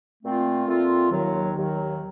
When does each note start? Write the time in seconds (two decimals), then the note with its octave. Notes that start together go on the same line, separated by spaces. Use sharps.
0.22 A#2 A3 C4 F4
0.67 A#2 A3 C4 F4
1.11 D#2 D#3 F#3
1.56 D#2 D#3 F#3